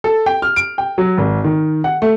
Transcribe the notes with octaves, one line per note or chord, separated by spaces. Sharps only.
A4
G5
F6
D7
G5
F#3
G#1
D#3
F#5
A3